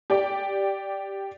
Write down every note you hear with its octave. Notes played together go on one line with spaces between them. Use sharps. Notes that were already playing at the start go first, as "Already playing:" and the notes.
G4 D5 G5